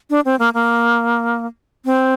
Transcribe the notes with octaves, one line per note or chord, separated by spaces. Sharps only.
D4
C4
A#3
A#3
C4